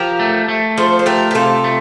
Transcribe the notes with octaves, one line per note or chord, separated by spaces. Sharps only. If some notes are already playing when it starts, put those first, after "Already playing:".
Already playing: F3 G4 A#4
A3
A3
F3 A4 C5
C5
A3 G4 A#4
G4
C3 F4 A4
A3